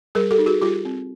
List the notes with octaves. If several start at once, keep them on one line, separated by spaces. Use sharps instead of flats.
G3 G#4 A#4
G4 A4
D#4
F#4 G#4
G3 F4 G4
C4